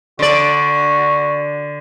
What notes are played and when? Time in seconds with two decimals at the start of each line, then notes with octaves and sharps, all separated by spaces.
0.19 D3 F#4 D5